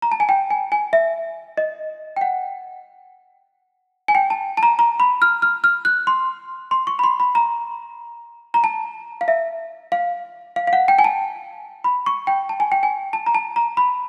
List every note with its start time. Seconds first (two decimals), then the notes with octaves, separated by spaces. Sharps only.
0.02 A#5
0.12 A5
0.20 G#5
0.29 G5
0.50 G#5
0.72 G#5
0.93 E5
1.57 D#5
2.16 G5
2.21 F#5
4.08 G#5
4.15 G5
4.30 A5
4.57 A5
4.63 A#5
4.79 A#5
5.00 B5
5.22 F6
5.42 F6
5.64 F6
5.85 F#6
6.07 C6
6.71 C6
6.87 C#6
6.99 B5
7.04 C6
7.20 B5
7.35 A#5
8.54 A#5
8.64 A5
9.21 F5
9.28 E5
9.92 F5
10.56 F5
10.67 F5
10.73 F#5
10.88 G5
10.99 G#5
11.04 A5
11.84 B5
12.06 C#6
12.27 G5
12.49 A5
12.60 G#5
12.72 G5
12.83 G#5
13.13 A5
13.26 A#5
13.35 A5
13.56 A#5
13.77 B5